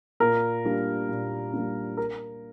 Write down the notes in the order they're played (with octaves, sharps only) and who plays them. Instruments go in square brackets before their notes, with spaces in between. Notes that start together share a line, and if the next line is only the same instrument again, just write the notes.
[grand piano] A#2 A#4
G3 A#3 D4
A#2
G3 A#3 D4
A#4